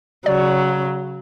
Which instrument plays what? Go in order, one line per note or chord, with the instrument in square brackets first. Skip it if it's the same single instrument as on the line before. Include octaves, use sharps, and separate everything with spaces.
[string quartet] C#3 F#3 [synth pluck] D5